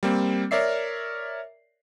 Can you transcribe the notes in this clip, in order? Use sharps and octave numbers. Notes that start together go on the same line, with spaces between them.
G3 A#3 C4
A#4 C#5 D5 E5 C7